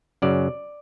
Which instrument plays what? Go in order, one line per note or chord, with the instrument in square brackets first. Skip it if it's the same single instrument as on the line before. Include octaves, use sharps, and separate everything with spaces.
[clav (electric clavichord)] F#2 C#3 F#3 D5